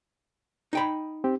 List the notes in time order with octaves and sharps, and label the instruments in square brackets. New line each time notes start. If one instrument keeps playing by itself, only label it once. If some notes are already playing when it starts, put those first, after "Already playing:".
[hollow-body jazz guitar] D#4 G5 B5
[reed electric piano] C4 G4